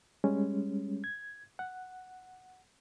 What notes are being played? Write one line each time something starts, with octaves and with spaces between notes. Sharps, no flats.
G3 G#3 C#4
G#6
F#5